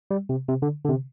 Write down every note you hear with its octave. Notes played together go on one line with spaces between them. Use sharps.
G3
C3
C3
D3
D3
C3